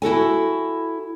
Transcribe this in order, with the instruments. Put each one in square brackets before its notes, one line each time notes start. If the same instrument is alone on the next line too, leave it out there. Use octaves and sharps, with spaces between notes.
[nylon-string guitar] E4 F#4 A4 G#5